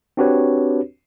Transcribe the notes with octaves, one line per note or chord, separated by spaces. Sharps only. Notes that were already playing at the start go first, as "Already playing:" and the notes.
C4 D4 F#4 G4 B4 C#5